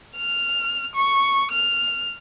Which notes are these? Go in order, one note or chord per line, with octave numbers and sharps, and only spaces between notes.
F6
C#6
F6